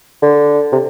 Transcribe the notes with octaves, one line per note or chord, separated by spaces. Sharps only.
D3
C3